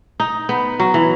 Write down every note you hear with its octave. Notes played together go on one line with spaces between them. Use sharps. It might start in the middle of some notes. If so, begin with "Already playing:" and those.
D#4
B3
F#3
E3